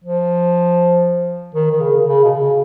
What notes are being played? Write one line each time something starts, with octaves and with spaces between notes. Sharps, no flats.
F3
D#3
D#3
C#3
C#3
B2
C#3